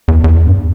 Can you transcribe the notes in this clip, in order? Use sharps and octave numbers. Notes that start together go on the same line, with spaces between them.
E2
E2
G2